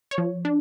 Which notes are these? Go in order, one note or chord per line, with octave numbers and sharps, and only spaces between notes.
C#5
F3
D4